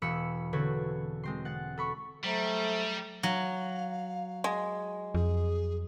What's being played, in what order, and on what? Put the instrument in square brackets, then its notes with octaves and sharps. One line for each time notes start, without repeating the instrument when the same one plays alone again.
[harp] E1 B5 E6 C#7
D3 C4 F#4 A4 B4 C#5
G#3 C4 C6
F#5 A6
A4 B5 C#6
[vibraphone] F#3 C5 A#5 [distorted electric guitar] G3 [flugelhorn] A3
[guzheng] F#3 [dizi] F5
[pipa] G#3
[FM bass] F2 [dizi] G#4